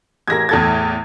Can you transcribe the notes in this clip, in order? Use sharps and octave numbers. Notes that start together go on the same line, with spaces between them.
A1 G#4 A#4 G#6 A#6
E2 A2 A4 G#6 A6